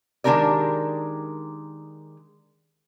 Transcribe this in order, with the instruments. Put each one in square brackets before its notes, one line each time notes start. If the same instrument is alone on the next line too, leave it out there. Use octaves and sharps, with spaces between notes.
[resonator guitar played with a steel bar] D#3 G#3 D4 G4 A#4 D5